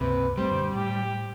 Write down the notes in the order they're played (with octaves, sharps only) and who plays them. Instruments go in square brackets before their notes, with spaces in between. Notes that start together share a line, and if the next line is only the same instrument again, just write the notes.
[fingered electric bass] C#2 G2 A#3 [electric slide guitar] C3 [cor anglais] B4
[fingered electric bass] A1 A3 C4 [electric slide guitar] G3 [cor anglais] C5
[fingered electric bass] F#2 A#2 D3
[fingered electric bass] A2 [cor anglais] G4